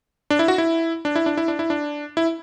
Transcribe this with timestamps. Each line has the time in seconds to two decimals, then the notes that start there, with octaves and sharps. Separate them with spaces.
0.30 D4
0.39 E4
0.48 F#4
0.58 E4
1.05 D4
1.16 E4
1.26 D4
1.37 E4
1.48 D4
1.59 E4
1.70 D4
2.17 E4